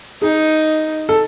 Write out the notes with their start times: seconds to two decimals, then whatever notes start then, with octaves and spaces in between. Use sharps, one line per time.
0.22 D#4 G#4
1.09 A4